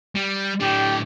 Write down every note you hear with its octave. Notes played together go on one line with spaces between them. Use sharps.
G3
A2 D4 G4